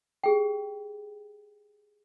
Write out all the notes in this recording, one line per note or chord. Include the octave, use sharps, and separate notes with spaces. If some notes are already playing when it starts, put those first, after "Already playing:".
G4 G#4 G5